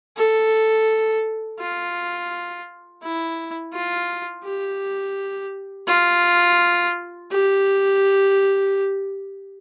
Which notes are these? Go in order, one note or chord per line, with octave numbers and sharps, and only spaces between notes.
A4
F4
E4
F4
G4
F4
G4